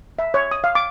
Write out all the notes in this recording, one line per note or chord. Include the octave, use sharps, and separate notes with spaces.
E5
C#5
D#6
F5
D6